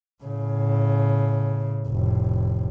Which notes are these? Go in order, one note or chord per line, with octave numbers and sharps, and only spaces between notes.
A2 C#3
F1 A2